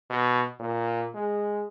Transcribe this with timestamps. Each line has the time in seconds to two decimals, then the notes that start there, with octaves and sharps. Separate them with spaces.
0.10 B2
0.60 A#2
1.14 G#3